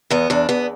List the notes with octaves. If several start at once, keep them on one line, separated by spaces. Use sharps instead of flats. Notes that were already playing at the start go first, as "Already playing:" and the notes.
E2 B3
E2 D4
E2 B3